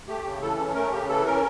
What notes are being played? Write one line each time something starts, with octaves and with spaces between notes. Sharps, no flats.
A3 G4
C#3
E3 A4
C#4
A3 A#4
C#3 G4
E3 A4
C#4 A#4